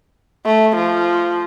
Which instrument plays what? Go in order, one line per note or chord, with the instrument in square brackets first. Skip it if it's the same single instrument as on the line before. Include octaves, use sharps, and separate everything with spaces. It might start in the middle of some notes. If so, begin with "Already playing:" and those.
[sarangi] A3
F3